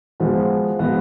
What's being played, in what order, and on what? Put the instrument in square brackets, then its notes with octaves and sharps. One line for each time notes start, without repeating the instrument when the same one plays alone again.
[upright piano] F3 G#3 B3 F#4
F3 G#3 B3 F#4